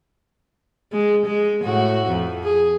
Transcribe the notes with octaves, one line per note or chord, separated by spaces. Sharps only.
G#3
G#3
A2 F#4
F2
G#4